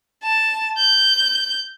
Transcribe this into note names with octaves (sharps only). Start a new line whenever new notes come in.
A5
G6